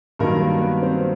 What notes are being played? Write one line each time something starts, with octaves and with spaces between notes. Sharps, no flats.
G2 D#3 F#3 A#3 A#4
A#3 A#4
B3 B4
C4 C5